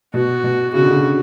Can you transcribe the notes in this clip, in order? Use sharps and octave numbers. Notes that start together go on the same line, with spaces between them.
B2 F#4
B2
C#3 F#4
D3
C#3